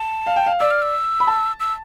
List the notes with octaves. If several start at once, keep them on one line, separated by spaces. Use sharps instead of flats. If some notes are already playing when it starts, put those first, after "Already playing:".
Already playing: A5
F5
G5
F5
D5 E6
F6
E6
B5
A5
E6